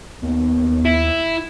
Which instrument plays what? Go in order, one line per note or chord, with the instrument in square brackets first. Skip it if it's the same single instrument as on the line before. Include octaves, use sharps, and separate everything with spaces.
[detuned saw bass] D#2 [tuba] B3
[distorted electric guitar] E4